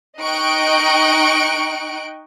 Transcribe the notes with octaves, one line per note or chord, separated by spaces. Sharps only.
D#4 D#5 G5 C#6 F#6 D7